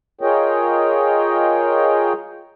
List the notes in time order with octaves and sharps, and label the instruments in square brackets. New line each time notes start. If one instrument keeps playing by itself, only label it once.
[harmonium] F4 G#4 A#4 C#5 D#5 G5